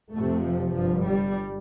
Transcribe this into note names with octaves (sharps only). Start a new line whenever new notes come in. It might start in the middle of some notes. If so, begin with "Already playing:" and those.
F1 F2 C3 A3
F3
G1 G2 F3
G3